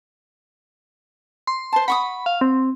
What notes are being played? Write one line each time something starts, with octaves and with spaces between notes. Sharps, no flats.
C6
C5 A5
F#5 B5 C#6 D#6
F5
C4